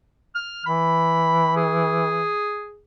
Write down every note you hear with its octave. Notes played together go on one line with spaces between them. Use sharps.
F6
E3 B5
G#4